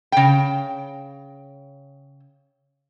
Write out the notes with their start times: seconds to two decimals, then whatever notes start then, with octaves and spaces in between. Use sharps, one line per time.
0.12 C#3 G5